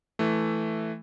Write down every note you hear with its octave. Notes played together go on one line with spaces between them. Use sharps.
E3 A3